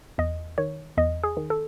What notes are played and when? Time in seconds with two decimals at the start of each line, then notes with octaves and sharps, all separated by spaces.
0.18 E2 D#5
0.58 D#3 C#5
0.97 E2 D#5
1.23 G#4
1.37 D#3
1.50 A4